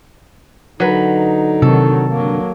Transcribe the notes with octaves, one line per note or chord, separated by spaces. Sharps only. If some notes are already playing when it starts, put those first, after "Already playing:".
D3 F#3 D#4 B4
C3 D#3 F#3 A4
G2 D3 F#3 A#3